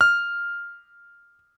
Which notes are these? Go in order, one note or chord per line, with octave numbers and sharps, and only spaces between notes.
F6